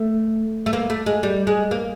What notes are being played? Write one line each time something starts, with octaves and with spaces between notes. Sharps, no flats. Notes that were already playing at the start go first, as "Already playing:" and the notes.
Already playing: A3
A3
A#3
A3
G#3
G3
G#3
A#3